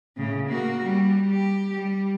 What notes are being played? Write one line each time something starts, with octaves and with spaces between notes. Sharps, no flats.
A2 C#3
A#3 F#4
G3
G4
G3